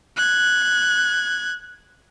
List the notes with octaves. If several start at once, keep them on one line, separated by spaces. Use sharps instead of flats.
F#6 G#6